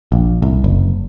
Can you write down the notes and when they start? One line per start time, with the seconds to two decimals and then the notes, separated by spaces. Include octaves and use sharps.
0.12 A#1
0.42 C2
0.64 F#1